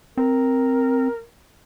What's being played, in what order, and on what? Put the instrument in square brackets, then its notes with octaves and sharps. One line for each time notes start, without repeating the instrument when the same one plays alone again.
[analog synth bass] C4 [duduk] A#4